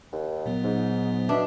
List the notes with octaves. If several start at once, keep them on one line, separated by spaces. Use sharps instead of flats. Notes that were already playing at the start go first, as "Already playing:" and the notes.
D#2
A#2 F#3 B3
G#2 D#4
B2 D4 E5